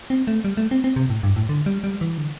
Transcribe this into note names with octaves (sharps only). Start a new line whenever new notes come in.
C4
A3
G3
A3
C4
C4
C3
A2
G2
A2
D3
G3
G3
E3
D3